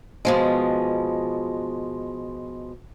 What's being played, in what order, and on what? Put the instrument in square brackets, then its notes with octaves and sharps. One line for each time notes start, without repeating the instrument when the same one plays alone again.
[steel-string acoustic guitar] B2 F3 G#3